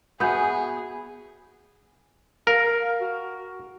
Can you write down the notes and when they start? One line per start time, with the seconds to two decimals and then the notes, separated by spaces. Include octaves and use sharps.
0.20 B3 F#4 G#4 E5 G#5 B5 D#6 G6
2.47 A#4 F5
3.00 F#4